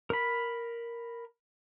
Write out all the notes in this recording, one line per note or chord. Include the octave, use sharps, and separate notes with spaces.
A#4 B5